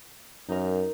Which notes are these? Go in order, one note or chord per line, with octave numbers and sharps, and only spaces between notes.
F#2 D#4 A#4